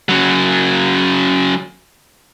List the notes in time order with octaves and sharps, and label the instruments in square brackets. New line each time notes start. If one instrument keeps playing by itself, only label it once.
[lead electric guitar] C#3 F#3